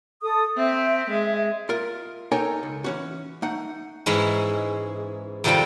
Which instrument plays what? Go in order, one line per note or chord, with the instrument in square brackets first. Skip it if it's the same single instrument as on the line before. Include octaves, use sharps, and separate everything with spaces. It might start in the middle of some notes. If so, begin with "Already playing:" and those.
[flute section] A4 D#6
[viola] C4 [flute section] E5
[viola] G#3
[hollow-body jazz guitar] F4 A#4
D#4 A4 A#4 C#5 G5 G#5
C#2
E3 C#4 F#4
A3 D#4 F#5
[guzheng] G#2 E3 G#3 C#4 E4
F2 C3 D#3 F3 G3 G5